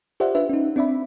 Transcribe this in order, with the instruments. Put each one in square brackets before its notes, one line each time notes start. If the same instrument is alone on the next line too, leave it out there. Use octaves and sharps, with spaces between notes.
[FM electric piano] F4 G4 C5 D5 E5 F#5
D4 F4 B4 E5
C#4 D#4
C4 D4 D5 E5 B5